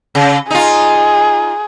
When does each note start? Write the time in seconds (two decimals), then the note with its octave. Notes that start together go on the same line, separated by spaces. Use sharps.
0.15 C#3
0.50 D#4 F4 G#4